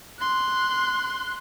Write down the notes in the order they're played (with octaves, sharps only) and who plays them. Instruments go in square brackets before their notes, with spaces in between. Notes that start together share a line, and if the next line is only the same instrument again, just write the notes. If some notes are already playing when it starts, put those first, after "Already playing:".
[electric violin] C6 F#6